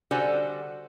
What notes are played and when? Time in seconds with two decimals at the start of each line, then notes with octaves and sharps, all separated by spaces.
0.11 D3 G3 F#4 A4 C5 G#5